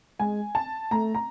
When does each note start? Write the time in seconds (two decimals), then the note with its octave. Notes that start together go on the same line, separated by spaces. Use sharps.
0.19 G#3 G#5
0.55 A5
0.91 A3 A#5
1.15 A#5